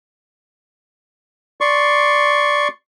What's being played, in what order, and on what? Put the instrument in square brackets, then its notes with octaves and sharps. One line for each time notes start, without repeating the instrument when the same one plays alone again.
[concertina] D5 C6 C#6